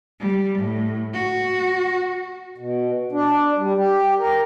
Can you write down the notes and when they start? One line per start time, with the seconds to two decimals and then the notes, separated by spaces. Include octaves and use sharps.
0.20 G3
0.59 A2
1.14 F#4
2.58 B2
3.12 D4
3.57 G3
3.77 G4
4.19 A#4